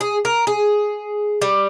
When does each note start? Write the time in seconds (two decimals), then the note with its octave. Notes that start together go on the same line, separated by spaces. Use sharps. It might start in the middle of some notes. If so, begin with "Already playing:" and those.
0.01 G#4
0.25 A#4
0.47 G#4
1.42 G3